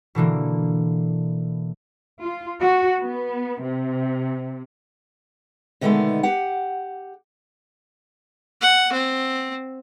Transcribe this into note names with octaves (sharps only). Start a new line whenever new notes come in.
B2 D3 E3 A#3
F4
F#4
B3
C3
B2 D3 D#3 G#3 A3 B3
G4 F#5
F#5
C4